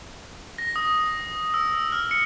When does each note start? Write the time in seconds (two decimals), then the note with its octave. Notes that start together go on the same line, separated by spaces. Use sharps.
0.58 A#6
0.76 D#6
1.54 E6
1.92 F6
2.11 C#7